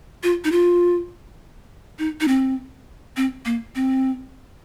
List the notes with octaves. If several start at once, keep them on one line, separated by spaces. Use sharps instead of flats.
F4
D#4
F4
D#4
D#4
C4
C4
A#3
C4